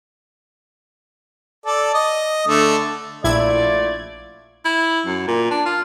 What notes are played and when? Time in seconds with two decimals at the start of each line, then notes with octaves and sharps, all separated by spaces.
1.66 A4 D5
1.94 D#5
2.47 D3 A3
3.24 A#1 A3 E4 F4 D5 G#6
4.65 E4
5.06 F#2
5.28 A#2
5.51 D4
5.66 F4